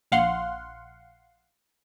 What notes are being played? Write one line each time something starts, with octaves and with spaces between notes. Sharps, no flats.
A#1 F5 F#5 C6